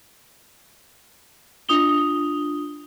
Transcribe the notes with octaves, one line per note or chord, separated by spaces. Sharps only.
D4 F4 D#6 F7 G7